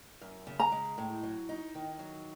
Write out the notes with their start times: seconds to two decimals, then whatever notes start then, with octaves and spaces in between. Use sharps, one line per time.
0.21 F#2
0.47 C#3
0.60 A#5
0.72 G#3
0.98 A2
1.23 F#3
1.49 D#4
1.75 D#3
1.99 F#3